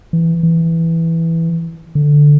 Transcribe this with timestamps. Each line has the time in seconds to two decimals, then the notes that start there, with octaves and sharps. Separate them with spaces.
0.13 E3
0.43 E3
1.95 D3